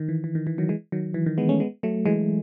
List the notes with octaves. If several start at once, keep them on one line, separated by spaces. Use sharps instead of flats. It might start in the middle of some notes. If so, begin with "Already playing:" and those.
Already playing: D#3
E3
E3
D#3
E3
D#3 F#3
E3 G#3
D#3 F#3
E3
D#3
G#3 B3
A3 C#4
G#3 B3
F#3 A3
E3 G#3